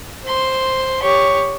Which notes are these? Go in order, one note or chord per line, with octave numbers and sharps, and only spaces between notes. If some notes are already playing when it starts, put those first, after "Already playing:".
C5 C6
G4 C#5